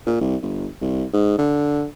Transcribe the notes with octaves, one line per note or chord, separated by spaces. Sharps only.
A#2
C2
G1
C2
G#2
D3